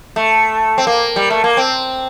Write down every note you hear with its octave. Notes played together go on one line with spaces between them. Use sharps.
A3
C4
A#3
G3
A3
A#3
C4